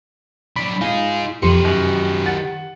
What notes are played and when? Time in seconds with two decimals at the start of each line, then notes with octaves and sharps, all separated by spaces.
0.56 F#3 D4 B5
0.81 D#4 F4 G#4 F5 G#5
1.42 F2 D#3 G4 B4 C6 C#7
1.65 F#2
2.26 F#5 A6